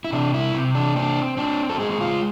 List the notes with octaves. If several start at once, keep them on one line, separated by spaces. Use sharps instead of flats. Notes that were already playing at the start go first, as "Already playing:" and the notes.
E4
C3 D4
E4
C3
D4
C4 D4
C4 D4
A4
G#3 G#4
G#4
F4